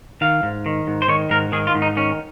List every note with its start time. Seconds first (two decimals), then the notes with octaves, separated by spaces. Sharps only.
0.21 D#3 F5
0.43 G#2
0.66 D#3
0.87 G#2
1.02 C5
1.08 D#3 C#5
1.30 G#2 A#4
1.52 D#3 G#4
1.67 F4
1.75 G#2
1.82 D#4
1.97 D#3 C#4